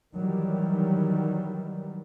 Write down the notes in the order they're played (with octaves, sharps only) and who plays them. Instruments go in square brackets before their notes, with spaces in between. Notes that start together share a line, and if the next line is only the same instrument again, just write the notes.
[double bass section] D#3 E3 F#3 G3